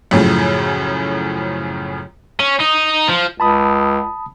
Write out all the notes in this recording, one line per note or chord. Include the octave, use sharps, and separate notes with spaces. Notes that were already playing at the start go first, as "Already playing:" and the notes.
F#2 A2 C#3 F3
C#4
D#4
F3
C#2 A5 B5 D#6